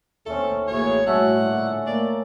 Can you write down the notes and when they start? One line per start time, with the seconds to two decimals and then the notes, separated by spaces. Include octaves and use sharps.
0.26 D#2 A3 C4 C#4 A4
0.68 A1 A2 A#3 F#4 G#4 C#5
1.07 A2 G3 C#4 F#4 E5 F#5 A5
1.41 A#2 D3
1.87 A3 A#3 D5